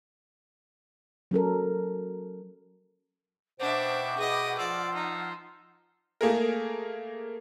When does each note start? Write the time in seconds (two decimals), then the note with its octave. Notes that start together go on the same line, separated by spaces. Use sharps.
1.31 F#3 C#4 A4 A#4
3.60 B2 D4 C5 E5 F#5 G5 D6
4.17 G#4 B4 D#5
4.58 F3 F4 D5 C6 E6
4.95 D#4
6.21 A3 A#3 G#4 A#4